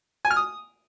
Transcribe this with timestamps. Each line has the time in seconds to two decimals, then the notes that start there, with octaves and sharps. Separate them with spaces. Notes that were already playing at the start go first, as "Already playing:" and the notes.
0.25 G#5
0.31 F6
0.36 D#6